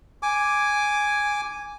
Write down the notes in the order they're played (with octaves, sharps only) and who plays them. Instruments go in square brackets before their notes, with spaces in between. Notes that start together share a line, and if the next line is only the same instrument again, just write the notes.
[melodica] G#5 D6